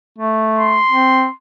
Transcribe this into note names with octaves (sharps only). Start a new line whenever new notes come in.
A3
C6
C4